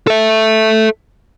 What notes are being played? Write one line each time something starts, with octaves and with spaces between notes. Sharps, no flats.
A4 E5